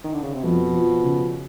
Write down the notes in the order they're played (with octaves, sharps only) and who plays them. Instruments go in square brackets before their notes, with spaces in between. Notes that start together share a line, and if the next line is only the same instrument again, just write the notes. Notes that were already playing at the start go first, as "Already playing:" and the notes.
[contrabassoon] D#3
D3
C#3
C3
[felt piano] F2 [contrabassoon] B2
[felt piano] F3
C#3